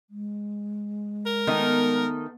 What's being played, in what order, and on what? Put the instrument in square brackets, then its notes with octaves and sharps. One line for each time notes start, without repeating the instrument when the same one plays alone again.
[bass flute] G#3
[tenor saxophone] A#4
[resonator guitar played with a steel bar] D#3 A3 D#4 [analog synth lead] B3